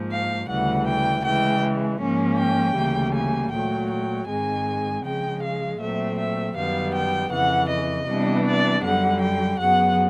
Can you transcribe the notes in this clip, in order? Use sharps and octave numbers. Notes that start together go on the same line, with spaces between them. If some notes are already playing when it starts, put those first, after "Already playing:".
Already playing: G#2 F3 A#3
F5
D2 C#3 E3 G3 F#5
G5
C#3 E3 G#3 G5
G#2 F3 A#3 C#4
G5
D2 C#3 E3 G3 A#3
G#5
A#2 F#3 A3 G5
G5
G#2 D#3 G#3 C4 G#5
C#3 F3 G#3 G5
F5
A#2 F#3 A3 C4 E5
E5
F#2 D#3 G3 B3 F5
G5
F2 C#3 E3 F#5
D#5
C3 E3 G3 B3 D4
D5
F#2 D3 G3 F#5
G5
F#2 C#3 F#3 B3 F#5